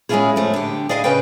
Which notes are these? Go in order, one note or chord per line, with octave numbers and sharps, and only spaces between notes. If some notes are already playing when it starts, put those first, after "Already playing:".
G#3 C#4 D4 E4 F4 G#4
F2 A3 C#4
D3 G4
G#4 D5 D#5 F5 G5 G#5
C#3 C#4 B4 D#5 G5